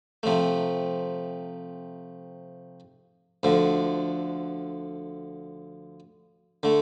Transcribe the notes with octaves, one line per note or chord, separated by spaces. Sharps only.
C3 F3 A3
D2 D3 F3
D3 A3